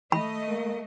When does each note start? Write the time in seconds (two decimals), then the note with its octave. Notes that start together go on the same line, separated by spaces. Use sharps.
0.12 A3 D#5 B5
0.48 A#3